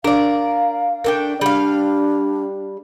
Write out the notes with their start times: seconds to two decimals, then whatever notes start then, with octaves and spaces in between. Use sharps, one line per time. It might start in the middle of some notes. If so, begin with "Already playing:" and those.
0.04 D4 A#4 D5 F5
1.04 A3 D4 A#4 G5
1.41 G3 D4 F5